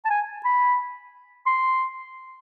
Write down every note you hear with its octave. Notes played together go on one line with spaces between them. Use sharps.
A5
G#5
B5
C6